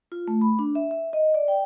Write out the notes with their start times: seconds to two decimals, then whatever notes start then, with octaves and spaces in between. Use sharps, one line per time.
0.12 F4
0.28 A3
0.41 B5
0.59 D4
0.75 E5
0.91 E5
1.13 D#5
1.34 D5
1.48 G5